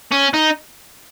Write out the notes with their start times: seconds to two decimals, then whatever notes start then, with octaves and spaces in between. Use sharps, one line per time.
0.12 C#4
0.34 D#4